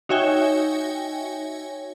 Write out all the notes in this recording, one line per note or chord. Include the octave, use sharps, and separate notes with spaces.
D#4 F#4 C#5 E5 G5 G#5